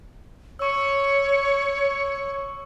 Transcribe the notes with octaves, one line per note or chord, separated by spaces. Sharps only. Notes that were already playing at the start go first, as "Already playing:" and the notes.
C#5 C#6 E6